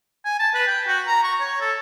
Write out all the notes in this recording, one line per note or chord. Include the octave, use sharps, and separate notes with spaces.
G#5
A5
B4
G5
F#4
A#5
C#6
C#5
A4